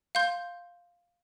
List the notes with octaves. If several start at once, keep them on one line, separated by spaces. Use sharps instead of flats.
F5 C6 G6